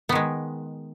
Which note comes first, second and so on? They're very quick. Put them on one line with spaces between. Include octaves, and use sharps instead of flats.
B3 D#3 G#3